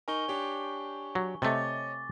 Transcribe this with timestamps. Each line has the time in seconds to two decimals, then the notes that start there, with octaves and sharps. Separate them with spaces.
0.08 D#4 A#4 G#5 C#6 G7
0.28 D4 G4 C#5
1.15 F#3
1.42 C3 A3 C#5 D#5 D6 A6